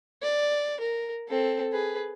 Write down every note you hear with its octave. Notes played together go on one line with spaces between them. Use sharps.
D5
A#4
C4 A4
G#4 B4